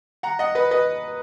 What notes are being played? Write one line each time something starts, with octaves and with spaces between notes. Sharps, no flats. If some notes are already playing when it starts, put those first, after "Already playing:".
F#5 A#5
D#5 F#5
B4 D#5
B4 D#5